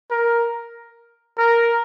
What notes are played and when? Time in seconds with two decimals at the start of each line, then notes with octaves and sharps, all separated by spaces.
0.11 A#4
1.38 A#4